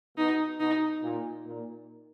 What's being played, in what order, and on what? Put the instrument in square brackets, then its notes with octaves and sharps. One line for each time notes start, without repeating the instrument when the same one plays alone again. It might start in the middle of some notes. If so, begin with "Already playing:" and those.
[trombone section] B2 [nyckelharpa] D#4
[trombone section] B2 [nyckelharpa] D#4
[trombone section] A#2
A#2